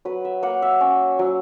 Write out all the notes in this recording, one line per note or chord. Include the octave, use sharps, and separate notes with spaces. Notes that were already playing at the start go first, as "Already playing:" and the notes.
F#3 B4
E5
A#3 F#5
E5
C#4
F#3